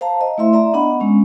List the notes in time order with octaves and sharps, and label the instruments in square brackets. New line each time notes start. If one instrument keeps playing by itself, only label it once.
[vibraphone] C5 F5 A5 A#5
D#5
A3 E4 E5 C6
D5 E5 A#5
B3 D4 D#5 F#5 B5
G#3 C#4